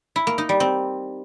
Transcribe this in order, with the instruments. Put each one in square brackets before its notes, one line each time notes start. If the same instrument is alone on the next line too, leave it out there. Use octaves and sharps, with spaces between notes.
[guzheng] E4
A#3
D#4
G3
C4